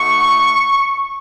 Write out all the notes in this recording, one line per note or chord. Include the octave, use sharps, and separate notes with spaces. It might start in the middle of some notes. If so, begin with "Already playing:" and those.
Already playing: A3 D#4 F#4 C#6